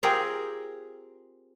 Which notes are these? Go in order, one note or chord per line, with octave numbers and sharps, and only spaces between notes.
C4 F4 G4 G#4 A#4 A#5